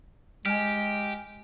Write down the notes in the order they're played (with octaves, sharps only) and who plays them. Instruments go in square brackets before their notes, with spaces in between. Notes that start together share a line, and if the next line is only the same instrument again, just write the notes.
[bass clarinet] G#3 [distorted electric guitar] G4 [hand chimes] G#5 F6